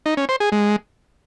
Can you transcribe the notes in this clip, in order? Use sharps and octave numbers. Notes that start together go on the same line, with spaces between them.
D#4
C#4
C5
G#4
G#3